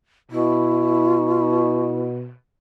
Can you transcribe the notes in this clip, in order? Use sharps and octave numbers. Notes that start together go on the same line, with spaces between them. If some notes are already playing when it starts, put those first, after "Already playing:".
B2 E4